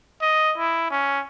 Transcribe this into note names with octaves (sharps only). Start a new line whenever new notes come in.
D#5
E4
C#4